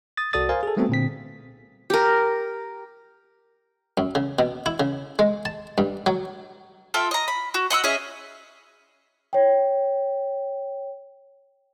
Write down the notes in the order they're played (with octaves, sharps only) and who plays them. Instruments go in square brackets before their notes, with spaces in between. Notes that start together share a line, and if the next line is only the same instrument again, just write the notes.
[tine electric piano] D#6 A6
C2 F#4 A4 D5 D#6 A6
A#4 C5 F5 G#5
G#4 A4
G3 A3 B3 C4 F#4 A4
A#2 D3 C4 B6
[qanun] G4 A#4
[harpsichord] F#2
C#3
B2
E4
C#3
G#3
A5
G2
F#3
[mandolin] F4 A4 E5 G5
D#5 A#5
B5
F#4
D#5 F#5 C6 E6
C#4 G#4 D#5 E5
[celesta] C#5 G5